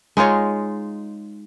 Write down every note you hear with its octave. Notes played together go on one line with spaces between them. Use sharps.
G#3 D#4 F4 C#5